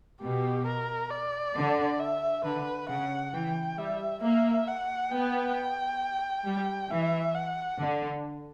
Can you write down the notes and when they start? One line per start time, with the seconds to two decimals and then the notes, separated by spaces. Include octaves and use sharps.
0.22 B2 G4
0.66 A#4
1.11 D5
1.55 D3
2.00 E5
2.44 D3 B4
2.89 C#3 F#5
3.33 E3 G5
3.78 G3 E5
4.22 A#3 E5
4.67 F#5
5.12 B3 G5
6.46 G3
6.90 E3 E5
7.35 F#5
7.80 D3